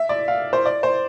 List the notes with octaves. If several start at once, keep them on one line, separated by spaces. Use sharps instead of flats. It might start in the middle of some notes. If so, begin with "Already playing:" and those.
Already playing: E5
D5
F5
C5
D5
C5